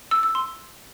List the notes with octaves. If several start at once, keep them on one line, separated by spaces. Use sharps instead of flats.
E6
E6
C6